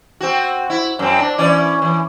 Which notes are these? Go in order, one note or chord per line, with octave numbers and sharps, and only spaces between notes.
C4 F#4
E4
F#2 C4
D4
E3 C#4 D5
E3